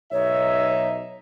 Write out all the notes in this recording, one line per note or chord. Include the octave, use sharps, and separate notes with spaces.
B1 D#4 C#5 E5